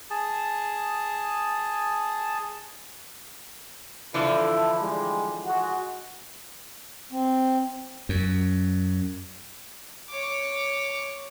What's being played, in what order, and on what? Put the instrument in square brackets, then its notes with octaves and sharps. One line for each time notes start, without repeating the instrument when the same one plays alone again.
[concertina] G#4 A5
[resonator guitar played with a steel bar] D3 E3 F3 [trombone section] E4 A4
[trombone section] G3 G#3
G#3 F#4
[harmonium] C4
[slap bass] F#2
[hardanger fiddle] C#5 D6